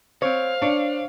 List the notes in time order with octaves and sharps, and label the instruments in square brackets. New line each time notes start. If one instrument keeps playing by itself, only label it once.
[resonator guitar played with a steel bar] C4 C#5 [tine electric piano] C5 [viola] F5
[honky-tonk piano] D4 [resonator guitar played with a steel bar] C#5